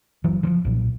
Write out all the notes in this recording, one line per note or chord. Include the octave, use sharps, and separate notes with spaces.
F#1 E3 F#3
D3 F3
B1 A#2